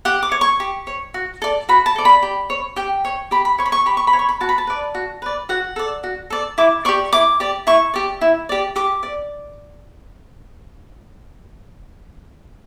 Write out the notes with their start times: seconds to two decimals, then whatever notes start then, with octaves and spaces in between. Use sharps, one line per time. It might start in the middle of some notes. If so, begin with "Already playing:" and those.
0.05 G4 F#5
0.23 D6
0.32 C#5
0.41 C#6
0.60 G4
0.87 C#5
1.14 F#4
1.42 A4 D5
1.69 F#4 B5
1.86 A5
1.96 A4 D5
2.05 B5
2.23 G4
2.50 C#5
2.76 G4 G5
3.05 C#5
3.31 G4 B5
3.45 B5
3.59 C#5 C#6
3.66 B5
3.72 C#6
3.86 G4 B5
3.97 C#6
4.07 B5
4.13 C#5
4.19 C#6
4.29 B5
4.41 F#4 A5
4.49 B5
4.58 A5
4.67 B4 D5
4.95 F#4
5.22 B4 D5
5.49 F#4 F#5
5.76 A4 D5
6.04 F#4
6.30 A4 D5
6.58 E4 D6
6.85 G4 D5 C#6
7.13 E4 D6
7.40 G4 D5
7.67 E4 C#6
7.94 G4 D5
8.21 E4
8.49 G4 D5
8.76 G4 D6
9.03 D5